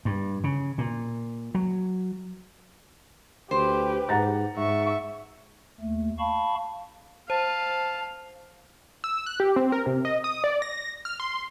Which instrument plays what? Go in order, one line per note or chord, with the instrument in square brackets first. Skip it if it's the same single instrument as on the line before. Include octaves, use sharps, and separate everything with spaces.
[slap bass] G2
C#3
A#2
F#3
[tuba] D2 [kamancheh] G4 B4 [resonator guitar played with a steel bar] C5
[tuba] G#2 [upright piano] F#5 A#5 A6
[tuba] G#2 [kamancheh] E5 C#6
[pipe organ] D#2 A3
F5 A5 B5 C#6
[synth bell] C5 [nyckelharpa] F5 [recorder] A5
[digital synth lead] E6
F#6
G4
C4
A#4
C3
D#5
D#6
D5
A#6
F6
C6